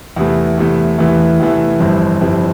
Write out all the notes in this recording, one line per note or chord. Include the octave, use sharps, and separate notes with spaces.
E2 C3 E3 A3
E2 C3 E3 A3
E2 C3 E3 A3
E2 C3 E3 A3
G1 F2 E3 G3 C4
G1 F2 E3 G3 C4